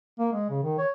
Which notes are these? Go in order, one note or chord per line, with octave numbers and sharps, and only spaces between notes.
A#3
G#3
C#3
D#3
C#5